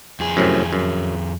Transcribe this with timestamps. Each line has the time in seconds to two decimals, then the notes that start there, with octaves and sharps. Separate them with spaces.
0.20 F2 G#4
0.37 F#2 A2 C3
0.73 F#2